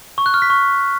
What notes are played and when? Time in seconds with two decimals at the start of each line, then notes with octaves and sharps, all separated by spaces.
0.18 C#6
0.26 F#6
0.34 F6
0.42 B6
0.50 C#6